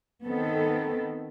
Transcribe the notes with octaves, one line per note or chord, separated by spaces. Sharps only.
D#3 B3 C4 A4